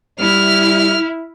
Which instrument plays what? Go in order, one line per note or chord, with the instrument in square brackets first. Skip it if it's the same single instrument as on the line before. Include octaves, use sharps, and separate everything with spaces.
[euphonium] G3 [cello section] E4 [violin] F6